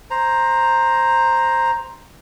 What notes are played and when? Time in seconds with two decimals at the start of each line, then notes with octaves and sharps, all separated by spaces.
0.10 C5 A#5